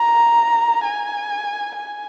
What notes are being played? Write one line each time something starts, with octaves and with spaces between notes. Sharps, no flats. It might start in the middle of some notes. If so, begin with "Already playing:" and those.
Already playing: A#5
G#5
G#5